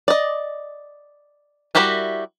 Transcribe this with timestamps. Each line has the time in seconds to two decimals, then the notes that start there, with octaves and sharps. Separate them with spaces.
0.08 D5 D#5
1.75 G3 E4 F#4 G4 A#4